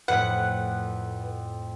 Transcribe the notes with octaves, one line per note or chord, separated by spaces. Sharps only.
F2 A2 B4 F#5